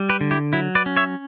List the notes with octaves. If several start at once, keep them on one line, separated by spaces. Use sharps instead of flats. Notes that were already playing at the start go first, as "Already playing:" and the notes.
Already playing: G3
G4 B4
D3
E4 G4
F#3 E4
B4 D5
C#4
C#5 E5